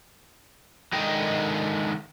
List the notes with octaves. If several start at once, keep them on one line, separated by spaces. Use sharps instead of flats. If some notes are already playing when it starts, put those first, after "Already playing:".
D3 D#3 G#3 A#4 D#5 G5